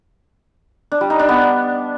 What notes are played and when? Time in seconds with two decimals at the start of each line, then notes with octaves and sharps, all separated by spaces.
0.92 D4
1.01 G3
1.10 D#4
1.19 D4
1.29 B3